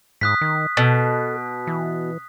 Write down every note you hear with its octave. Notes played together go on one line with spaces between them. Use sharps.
G#2 D#6 F#6 B6
D#3
B2 A4
E3